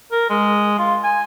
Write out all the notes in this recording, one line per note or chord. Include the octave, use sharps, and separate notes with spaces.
A#4
G#3
F4
G#5